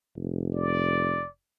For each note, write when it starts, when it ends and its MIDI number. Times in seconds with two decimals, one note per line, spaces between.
0.16 1.23 29
0.55 1.28 74